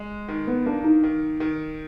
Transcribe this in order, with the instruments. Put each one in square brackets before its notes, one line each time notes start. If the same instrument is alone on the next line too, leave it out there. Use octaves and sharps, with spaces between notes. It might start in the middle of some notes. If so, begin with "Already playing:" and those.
Already playing: [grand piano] G#3
D#3
[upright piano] B3
[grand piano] A#3 [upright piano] D4
[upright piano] D#4
[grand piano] D#3
D#3